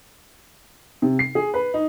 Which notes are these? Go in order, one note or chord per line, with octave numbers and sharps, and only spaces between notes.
C3
C7
G#4
B4
D#4